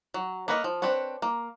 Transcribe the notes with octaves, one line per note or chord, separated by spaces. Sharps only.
F#3
A#3 A#4 B4 C#5 D#5
F3
C4 D4 B4 C#5
A#3